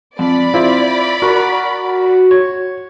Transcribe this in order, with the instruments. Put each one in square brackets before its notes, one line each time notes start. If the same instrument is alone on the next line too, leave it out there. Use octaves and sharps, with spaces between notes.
[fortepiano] F2 [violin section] D5 B5
[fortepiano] C4 E4 F4
[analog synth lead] F#4 [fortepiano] A#4
[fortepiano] C#5